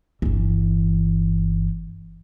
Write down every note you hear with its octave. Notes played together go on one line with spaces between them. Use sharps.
G1 E3